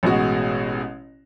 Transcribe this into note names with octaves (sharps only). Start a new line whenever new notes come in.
A1 B2 G#3 F#4